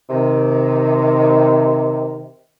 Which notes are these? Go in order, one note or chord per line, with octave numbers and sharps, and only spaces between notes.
C3 D#3